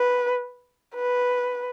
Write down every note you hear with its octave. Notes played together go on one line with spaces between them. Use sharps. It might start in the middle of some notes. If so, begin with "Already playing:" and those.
Already playing: B4
B4